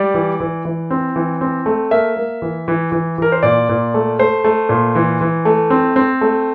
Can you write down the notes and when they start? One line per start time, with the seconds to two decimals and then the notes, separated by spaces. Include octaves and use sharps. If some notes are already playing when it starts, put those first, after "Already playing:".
Already playing: G3 D5
0.14 E3
0.40 E3
0.65 E3
0.91 C4
1.16 E3
1.41 C4
1.66 A3
1.91 A#3 E5
2.16 A#3
2.42 E3
2.68 E3
2.92 E3
3.18 E3 A#4
3.32 C5
3.43 A#2 D5
3.69 A#2
3.94 A3
4.19 A3 C5
4.44 A3
4.69 A#2
4.95 E3
5.21 E3
5.45 A3
5.70 C4
5.96 C4
6.21 A3